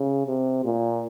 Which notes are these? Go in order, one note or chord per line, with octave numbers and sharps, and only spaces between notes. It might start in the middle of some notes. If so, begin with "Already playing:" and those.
Already playing: C#3
C3
A#2